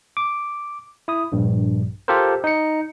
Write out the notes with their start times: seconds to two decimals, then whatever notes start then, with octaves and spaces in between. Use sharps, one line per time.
0.17 D6
1.08 E4 D#6
1.32 A#1 G2
2.08 F4 G4 A4 A#4 C5
2.44 D#4 C#7